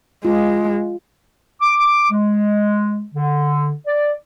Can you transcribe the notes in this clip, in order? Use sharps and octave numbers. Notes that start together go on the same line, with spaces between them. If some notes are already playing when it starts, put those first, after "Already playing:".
G#3 F4
D6
G#3
D3
D5